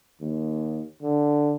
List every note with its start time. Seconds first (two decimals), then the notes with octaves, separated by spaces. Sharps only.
0.21 D#2
1.02 D3